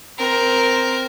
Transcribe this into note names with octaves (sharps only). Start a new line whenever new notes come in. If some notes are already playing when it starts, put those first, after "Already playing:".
C4 A#4